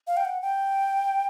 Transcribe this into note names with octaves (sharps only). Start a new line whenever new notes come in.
F5
G5
F#5
G5